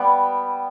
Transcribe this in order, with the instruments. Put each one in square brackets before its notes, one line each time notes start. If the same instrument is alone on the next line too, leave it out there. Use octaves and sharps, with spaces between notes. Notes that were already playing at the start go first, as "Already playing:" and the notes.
Already playing: [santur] G3 B3